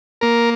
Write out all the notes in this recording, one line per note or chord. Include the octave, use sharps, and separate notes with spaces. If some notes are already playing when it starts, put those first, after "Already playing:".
A#3 A#4